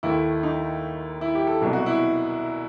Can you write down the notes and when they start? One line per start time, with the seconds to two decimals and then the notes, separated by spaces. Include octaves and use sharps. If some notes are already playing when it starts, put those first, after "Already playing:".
0.03 D#2 D#3 A3 E4
0.43 D#4
1.21 E4
1.35 G4
1.47 A4
1.61 C2 B2 F#3
1.73 F#4
1.86 E4